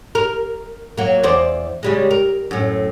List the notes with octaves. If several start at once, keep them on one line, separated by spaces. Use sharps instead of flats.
A#4
F#3 A#3
E2 C5 D5
C#3 G3 G#3
A#4
F#2 A2